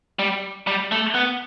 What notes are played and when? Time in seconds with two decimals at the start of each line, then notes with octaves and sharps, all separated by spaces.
0.19 G3
0.67 G3
0.92 A3
1.15 B3